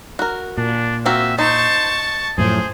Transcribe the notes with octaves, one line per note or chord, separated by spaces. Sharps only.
F#4 A#4
A#2 D4
A#3 C4 F#4 E5
D#4 C5 A5 C#6
F#2 A2 F3 G#4 C5